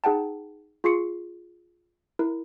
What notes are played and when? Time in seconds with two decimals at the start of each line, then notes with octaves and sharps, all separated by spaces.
0.04 D#4 G#4 F#5 G5 A5
0.84 F4 G#4 C6 C#6 C7 C#7
2.19 E4 A#4